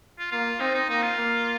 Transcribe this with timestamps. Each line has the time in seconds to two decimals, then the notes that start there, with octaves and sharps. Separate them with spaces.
0.18 F4
0.32 A#3 F4
0.60 C4 D#4
0.75 D#4
0.88 A#3 D#4
1.02 F4
1.18 A#3